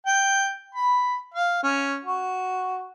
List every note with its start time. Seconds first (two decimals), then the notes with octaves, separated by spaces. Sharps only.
0.06 G5
0.75 B5
1.34 F5
1.63 C#4
2.05 F#4